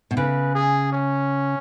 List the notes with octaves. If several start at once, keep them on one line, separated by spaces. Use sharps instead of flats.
B2
C#3 B4
G#4
C#4